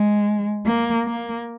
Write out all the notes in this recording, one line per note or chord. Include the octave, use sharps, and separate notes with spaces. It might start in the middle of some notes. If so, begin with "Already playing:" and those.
Already playing: G#3
A#3
A#3